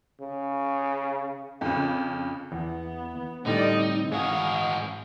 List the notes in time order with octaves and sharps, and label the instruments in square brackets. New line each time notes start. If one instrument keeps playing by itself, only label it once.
[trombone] C#3
[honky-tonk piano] F2 C#3
[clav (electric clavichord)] E2 [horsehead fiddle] B3
[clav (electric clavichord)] A2 D3 G3 [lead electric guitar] D#4 [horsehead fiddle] D5 D#5
[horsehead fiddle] C4
[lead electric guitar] G#2 F#4 [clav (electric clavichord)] G#3 [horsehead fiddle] D#5 F5